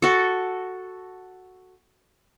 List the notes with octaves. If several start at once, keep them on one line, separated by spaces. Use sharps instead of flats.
F#4 A4